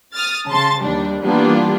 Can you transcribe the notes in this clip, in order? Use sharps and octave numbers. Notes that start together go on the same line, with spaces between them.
D#6 F6 A6
C#3 A5 C6 A6
D#2 G3 D4
E3 G3 A#3 B3 D4 F4